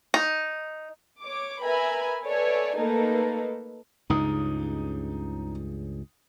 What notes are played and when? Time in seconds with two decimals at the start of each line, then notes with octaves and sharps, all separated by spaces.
0.14 D#4
1.23 C#5 D6
1.63 A#4 B4 E5 G#5 A#5 B5
2.24 A4 B4 C#5 D5 E5 G#5
2.76 A3 A#3 D#4 A4 B4
4.10 C#2 G2 C#3 D#4 D#6